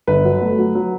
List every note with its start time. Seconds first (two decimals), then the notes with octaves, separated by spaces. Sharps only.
0.07 G1 B4
0.25 F#3
0.41 A3
0.59 F#3
0.75 F#3